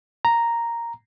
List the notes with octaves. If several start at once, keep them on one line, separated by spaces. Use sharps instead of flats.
A#5